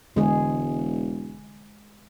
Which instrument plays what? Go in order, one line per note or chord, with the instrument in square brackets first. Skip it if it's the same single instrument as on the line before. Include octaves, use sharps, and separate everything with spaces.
[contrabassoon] E1 [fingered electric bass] D3 E3 [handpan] G#3 G#4